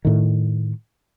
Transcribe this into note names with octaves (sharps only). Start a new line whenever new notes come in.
A2 D#3